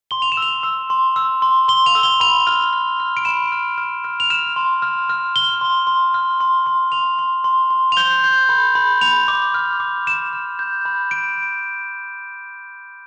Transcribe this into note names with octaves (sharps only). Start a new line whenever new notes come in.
C6 G7
F7
E7
E6
F7
E6
C6
E6
C6
C6 G7
F7
E6
G7
B5 F7
F6
F6
F6
D7
B5 E7
F6
F6
F6
F7
F6 E7
C6
F6
F6
F6 G7
C6
C6
F6
C6
C6
C6 F7
C6
C6
C6
F7
G6 G7
G6
B5
B5
B5 F7
D6
F6
D6
D6 E7
F6
G6
B5
D7